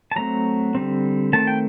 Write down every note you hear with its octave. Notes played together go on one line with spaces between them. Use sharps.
A5
F#3 A3 C4 A#5
D3 G3 C4
D#3 A3 C4 A5
G5